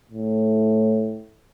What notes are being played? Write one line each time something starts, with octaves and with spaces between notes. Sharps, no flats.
A2